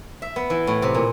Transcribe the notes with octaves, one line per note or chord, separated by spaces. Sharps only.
E5
B3
E3
A2
C3
A#2